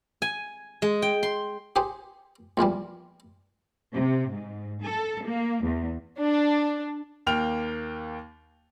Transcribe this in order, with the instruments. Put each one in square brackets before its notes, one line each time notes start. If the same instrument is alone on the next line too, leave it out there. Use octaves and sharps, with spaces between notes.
[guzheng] G#5
G#3
G5
C6
[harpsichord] G4 G#4 C5 C6
A#1 E2 E3 G3
[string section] C3
G#2
A4
A#3
E2
[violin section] D4
[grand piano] D#2 A#3 G5 F6 F7